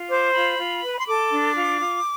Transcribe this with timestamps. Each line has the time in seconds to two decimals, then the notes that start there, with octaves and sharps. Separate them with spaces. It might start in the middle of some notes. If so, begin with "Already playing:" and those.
Already playing: F4
0.09 C5 D6
0.34 F4 B5
0.58 F4
0.82 B4
1.00 C6
1.06 A4 D6
1.31 D4
1.55 F4
1.80 F4